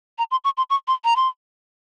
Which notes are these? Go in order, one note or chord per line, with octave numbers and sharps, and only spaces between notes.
A#5
C6
C#6
C6
C#6
C6
A#5
C6